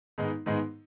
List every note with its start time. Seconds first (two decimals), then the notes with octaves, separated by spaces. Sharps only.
0.18 G#2 D#3 G#3 B3 D#4
0.46 G#2 D#3 G#3 B3 D#4